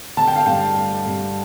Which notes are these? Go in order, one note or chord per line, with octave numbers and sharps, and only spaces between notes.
D3 A5
G5
F5
G2 G5
A3
G2